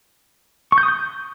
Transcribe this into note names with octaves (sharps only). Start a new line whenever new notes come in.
C#6
G6
D#6
G6